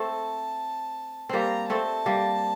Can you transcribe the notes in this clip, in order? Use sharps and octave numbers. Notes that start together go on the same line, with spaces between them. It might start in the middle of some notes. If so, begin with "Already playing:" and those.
Already playing: A3 C4 A5
G3 A#3 C4 A#5
A3 C4 A5
G3 A#3